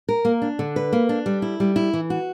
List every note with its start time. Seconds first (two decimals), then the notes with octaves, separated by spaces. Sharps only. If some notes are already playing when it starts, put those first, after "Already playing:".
0.09 A#4
0.25 A#3
0.42 D4
0.59 D3
0.76 B4
0.93 A#3
1.09 D4
1.26 G3
1.42 E4
1.60 G3
1.76 E4
1.94 E3
2.10 F#4